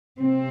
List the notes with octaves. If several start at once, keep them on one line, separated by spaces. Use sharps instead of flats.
C3 C4